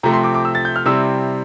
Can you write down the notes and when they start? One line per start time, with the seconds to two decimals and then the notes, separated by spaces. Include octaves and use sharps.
0.03 C3 F3 A3 C4 A#5
0.13 C6
0.24 D6
0.34 D6
0.45 E6
0.55 A6
0.65 G6
0.76 F6
0.85 C3 G3 C4 E4 E6